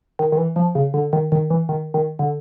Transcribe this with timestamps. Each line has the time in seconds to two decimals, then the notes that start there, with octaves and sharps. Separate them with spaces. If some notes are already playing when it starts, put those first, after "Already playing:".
0.19 D#3
0.32 D#3
0.37 E3
0.56 F3
0.75 C#3
0.94 D3
1.13 D#3
1.32 D#3
1.50 E3
1.69 D#3
1.94 D#3
2.19 D3